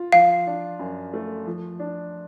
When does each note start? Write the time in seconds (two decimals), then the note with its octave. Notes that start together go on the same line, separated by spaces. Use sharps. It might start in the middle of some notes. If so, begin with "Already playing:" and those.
Already playing: F4
0.12 F3 F5
0.47 D4
0.79 F#2
1.14 A3
1.47 F3
1.79 D4